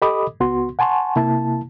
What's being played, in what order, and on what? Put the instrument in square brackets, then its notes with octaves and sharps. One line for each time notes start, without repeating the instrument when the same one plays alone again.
[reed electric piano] G4 A4 D#5 B5 D6 D#6
C#2 B3 F#4 C6
F#5 G#5 A5 C6 C#6
C3 A#3 E4 A5